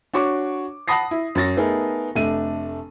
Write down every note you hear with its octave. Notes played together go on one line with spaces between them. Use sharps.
D4 F#4 C#5 C#6 D6
F#5 A5 B5 D#6 A#6 C7
E4
F#2 C#5 A6 A#6
A3 B3 D#4 G#4 A#4
F1 A3 D4 D#7